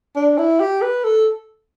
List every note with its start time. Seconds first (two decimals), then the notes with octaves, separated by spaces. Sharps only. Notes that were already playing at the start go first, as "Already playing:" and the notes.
0.16 D4
0.39 E4
0.60 G4
0.82 B4
1.04 A4